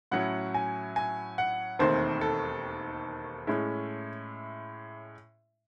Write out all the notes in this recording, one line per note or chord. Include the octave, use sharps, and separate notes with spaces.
A2 F#3 C#4 E4 F#5
G#5
G#5
F#5
E1 D#2 D#3 A3 C4 C5
A4
A2 G#3 C#4 E4